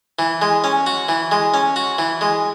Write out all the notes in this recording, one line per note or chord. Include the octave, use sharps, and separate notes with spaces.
E3
G#3
C#4
F#4
E3
G#3
C#4
F#4
E3
G#3